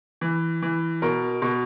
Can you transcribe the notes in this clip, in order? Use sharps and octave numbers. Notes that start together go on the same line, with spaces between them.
E3
E3
B2 A#4
B2